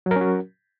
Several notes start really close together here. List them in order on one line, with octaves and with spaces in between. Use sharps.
F#3 A#4 C#4 F#4